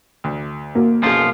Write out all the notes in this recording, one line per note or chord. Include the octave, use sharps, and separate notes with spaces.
D2
A#3 F#4
B1 F#2 F3 F4 G#4